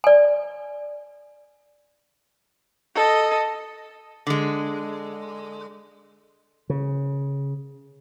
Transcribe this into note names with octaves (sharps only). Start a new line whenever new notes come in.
D5 G#5
A4 D#5
D3 G#3
C#3